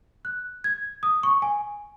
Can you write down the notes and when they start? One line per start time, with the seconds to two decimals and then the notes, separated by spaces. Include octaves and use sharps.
0.25 F#6
0.64 G#6
1.03 D#6
1.23 C#6
1.42 G#5